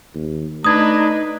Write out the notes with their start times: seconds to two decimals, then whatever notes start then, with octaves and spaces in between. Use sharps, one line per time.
0.15 D#2
0.65 A3 D4 D#4 B4 A#5 D#6 G#6